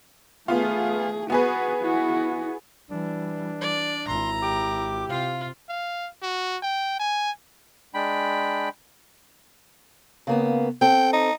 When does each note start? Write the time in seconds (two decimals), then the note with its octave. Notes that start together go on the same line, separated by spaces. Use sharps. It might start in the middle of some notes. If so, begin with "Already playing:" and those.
0.48 A3 B3 F4 G#4
1.30 B3 F#4 G#4 B4
1.80 E4 F#4
2.91 E3 G3 D4
3.61 D5
4.07 G#1 E4 A#5 C6
4.42 G4 D6
5.09 C3 F4 F5
5.69 F5
6.22 F#4
6.63 G5
7.00 G#5
7.94 G#3 D4 G5 B5
10.27 C#3 A#3 B3
10.81 C4 A4 G5
11.13 D#4